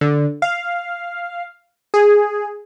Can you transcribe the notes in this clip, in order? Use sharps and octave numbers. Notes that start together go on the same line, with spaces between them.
D3
F5
G#4